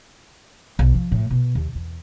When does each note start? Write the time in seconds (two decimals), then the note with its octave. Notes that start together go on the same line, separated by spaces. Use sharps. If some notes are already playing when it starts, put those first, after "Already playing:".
0.79 B1
0.94 F3
1.12 A2
1.30 B2
1.55 D#2
1.75 E2